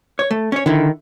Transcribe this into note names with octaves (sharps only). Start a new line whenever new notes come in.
C#5
A3
C#4 C#5
D3 D#3 E4